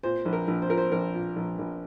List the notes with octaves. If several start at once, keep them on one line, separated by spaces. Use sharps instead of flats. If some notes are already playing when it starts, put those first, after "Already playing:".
A#2 C5
A#1
A#4
A#1
C5
A#2 A#4
C5
A#1 A#4
A#2
A#1
A#1